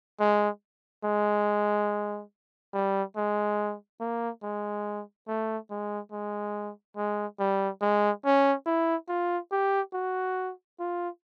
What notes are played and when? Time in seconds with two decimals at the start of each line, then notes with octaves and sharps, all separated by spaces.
0.20 G#3
1.04 G#3
2.73 G3
3.16 G#3
4.00 A#3
4.43 G#3
5.28 A3
5.70 G#3
6.12 G#3
6.97 G#3
7.39 G3
7.81 G#3
8.25 C#4
8.66 E4
9.09 F4
9.51 G4
9.93 F#4
10.79 F4